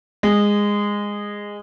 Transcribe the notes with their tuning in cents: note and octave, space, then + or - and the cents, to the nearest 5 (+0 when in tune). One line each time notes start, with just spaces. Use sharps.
G#3 -15